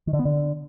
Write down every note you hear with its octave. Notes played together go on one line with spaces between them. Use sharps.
D#3
D3
B3
D3